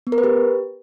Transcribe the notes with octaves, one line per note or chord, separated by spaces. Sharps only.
B3
A#4
B4
G4